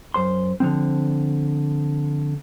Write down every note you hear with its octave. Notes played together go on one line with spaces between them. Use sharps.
F#2 C5 C6
D3 F3 C4